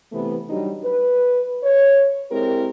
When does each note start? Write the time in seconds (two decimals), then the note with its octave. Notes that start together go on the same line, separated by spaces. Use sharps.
0.12 C3 E3 A3 B3
0.49 F#3 G3 D4 D#4
0.83 B4
1.64 C#5
2.30 G#3 C4 E4 G4 A#4